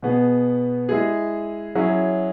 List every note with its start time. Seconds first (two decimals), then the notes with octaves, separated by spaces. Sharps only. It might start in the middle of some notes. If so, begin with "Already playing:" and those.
0.03 B2 B3 G#4
0.89 G#3 E4 G#4
1.75 F#3 C#4 E4 G#4